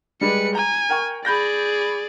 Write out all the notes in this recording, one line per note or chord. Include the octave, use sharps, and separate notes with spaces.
G3 G#3 B4 C#7
G#5 A#5
A#4 G5 C#6
G#4 D5 B5 G6 A#6